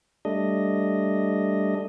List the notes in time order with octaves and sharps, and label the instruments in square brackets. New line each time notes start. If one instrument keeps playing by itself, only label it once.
[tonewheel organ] G3 A3 D4 D#5